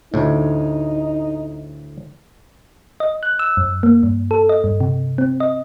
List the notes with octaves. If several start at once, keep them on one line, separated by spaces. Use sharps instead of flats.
D2 A2 D#4
D#5
F#6
E6
F#2
A#3
G2
A4
D#5
G2
C3
C4
D#5